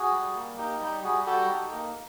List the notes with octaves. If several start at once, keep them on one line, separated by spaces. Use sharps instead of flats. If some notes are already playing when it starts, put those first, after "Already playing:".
Already playing: F#4 G#4
G3
A#3
D#4 G4
G3 G4
G3 F#4 G#4
F#4 G4 A4
D#4
A#3